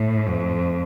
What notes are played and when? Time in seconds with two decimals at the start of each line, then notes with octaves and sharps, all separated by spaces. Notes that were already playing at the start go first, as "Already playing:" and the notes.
Already playing: A2
0.28 F2